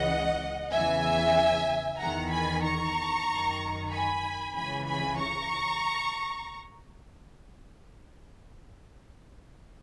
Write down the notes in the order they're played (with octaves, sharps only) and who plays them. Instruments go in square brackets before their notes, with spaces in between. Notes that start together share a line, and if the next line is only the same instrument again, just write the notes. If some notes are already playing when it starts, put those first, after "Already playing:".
Already playing: [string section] C#2 C#3 E3 D#5 F#5
E2 C#3 E3 E5 G#5
E2 D#3 F#5 A#5
G#5 B5
A#5 C#6
F#2 D#3
G#5 B5
C#2 C#3 E3 G#5 B5
G#5 B5
A#5 C#6